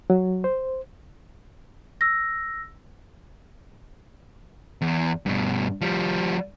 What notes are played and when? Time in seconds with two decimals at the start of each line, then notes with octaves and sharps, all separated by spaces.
0.10 F#3
0.44 C5
2.01 E6 A#6
4.82 E2
5.26 G2 B2
5.81 F3 G3